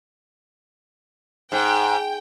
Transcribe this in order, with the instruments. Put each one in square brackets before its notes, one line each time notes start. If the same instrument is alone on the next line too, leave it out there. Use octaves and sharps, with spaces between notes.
[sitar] G#2 [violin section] G5